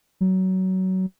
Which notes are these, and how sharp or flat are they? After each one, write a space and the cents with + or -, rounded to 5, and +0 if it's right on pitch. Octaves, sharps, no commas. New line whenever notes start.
F#3 +20